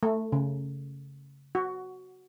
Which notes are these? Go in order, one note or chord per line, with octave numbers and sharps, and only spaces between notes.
A3
C#3
F#4